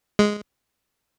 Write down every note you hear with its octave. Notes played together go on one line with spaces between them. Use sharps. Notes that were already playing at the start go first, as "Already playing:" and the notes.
G#3